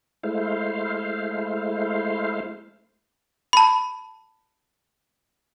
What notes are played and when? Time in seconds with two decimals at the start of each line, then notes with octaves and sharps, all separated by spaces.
0.23 G#3 A3 E4 C5 F5
3.53 A5 B5